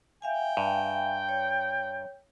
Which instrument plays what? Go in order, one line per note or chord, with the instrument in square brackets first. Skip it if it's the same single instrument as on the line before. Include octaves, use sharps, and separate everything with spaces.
[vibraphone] E5 F5 G#5 [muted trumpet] G5
[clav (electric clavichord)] G2
[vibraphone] C#5